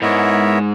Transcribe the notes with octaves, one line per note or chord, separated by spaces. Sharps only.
G#2 B3 E4 A#4 C#5 E5